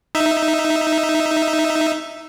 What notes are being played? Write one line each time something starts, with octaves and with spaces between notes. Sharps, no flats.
D#4 E5